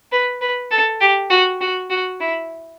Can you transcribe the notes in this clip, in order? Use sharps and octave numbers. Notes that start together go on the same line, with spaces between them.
B4
B4
A4
G4
F#4
F#4
F#4
E4